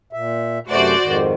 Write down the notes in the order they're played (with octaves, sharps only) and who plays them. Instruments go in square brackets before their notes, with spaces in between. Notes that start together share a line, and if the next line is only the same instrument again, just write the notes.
[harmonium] A#2 E5
[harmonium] F#2 C3 A3 [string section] F#4 C5 D5
[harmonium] F2 G#2 D#3